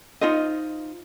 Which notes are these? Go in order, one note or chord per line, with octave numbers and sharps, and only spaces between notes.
D#4 F4 C5 D#5